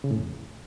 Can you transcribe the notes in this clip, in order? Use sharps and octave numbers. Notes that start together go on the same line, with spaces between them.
C#3
A2
F2